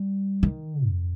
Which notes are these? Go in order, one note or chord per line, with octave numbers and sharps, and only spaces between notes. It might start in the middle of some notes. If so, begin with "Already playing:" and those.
Already playing: G3
D#3
F2